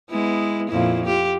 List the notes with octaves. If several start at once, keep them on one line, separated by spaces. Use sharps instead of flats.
G#3 B3 E4
F2 A#2 E4
F4 G4